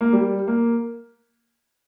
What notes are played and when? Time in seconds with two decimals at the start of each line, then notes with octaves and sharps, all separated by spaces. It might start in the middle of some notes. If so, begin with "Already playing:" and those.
0.01 A#3
0.13 G3
0.47 A#3